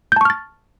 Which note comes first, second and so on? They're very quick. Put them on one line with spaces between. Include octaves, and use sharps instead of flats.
G6 A5 C#6 F6 A6